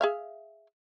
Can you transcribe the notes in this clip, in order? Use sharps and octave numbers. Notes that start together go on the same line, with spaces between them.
G#4 E5 F5